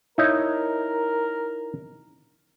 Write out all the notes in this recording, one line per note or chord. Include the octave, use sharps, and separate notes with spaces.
D#4 E4 A#4 C#5